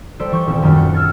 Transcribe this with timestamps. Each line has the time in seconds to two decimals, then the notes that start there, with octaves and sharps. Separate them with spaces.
0.19 G3 A4 C5 D5
0.31 E3 C#6 G6
0.47 D#1 C4
0.62 F#2 D#3 G3 A3 C#4 F#4
0.75 F#6 G6 C#7
0.93 E6 F6 G#6 A6 C#7